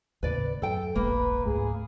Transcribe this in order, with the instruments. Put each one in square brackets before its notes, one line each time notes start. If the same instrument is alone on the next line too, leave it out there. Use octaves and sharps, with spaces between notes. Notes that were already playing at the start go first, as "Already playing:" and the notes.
[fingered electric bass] D#2 A2 C#3 [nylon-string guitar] B4 D5
[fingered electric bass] F#2 [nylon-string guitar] A4 G5
[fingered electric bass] E1 A#1 [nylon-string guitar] A#3 [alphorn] B4
[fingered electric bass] C#2 G#2 A3 [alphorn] G#4